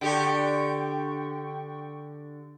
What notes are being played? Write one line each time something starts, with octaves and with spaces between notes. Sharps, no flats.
D3 G4 G5 C#6